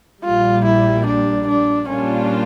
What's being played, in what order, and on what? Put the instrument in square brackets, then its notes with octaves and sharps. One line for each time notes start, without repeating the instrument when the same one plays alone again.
[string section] A#1 A#2 G3 [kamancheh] F4
[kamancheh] E4
D4
D4
[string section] A#2 G3 A#3 D4 F4 [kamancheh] C#4